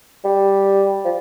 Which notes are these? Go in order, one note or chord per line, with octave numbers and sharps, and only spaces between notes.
G3
F3